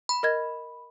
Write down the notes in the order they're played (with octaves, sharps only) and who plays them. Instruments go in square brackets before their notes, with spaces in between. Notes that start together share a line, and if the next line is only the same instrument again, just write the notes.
[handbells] B5
[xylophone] A#4 D#5 G#6